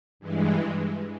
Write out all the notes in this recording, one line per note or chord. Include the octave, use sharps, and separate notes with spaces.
G2 E3 G#3